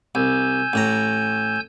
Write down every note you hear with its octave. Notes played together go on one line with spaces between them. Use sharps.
C2 G#5 E6 G6
A1 A2 A#5